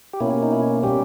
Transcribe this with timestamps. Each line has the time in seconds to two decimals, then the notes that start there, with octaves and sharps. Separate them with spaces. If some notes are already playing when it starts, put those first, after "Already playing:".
0.13 G4
0.20 B2 A#3 C#4 E4
0.43 D#4
0.52 E4
0.83 B2 G3 C#4 G4